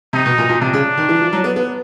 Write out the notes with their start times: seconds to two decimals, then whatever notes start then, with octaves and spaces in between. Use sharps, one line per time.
0.13 C3 D#4
0.26 B2
0.38 A#2
0.49 A#2
0.61 C3 D4
0.73 C#3
0.97 D#3
1.09 E3
1.21 F3
1.33 F#3
1.44 B3
1.56 B3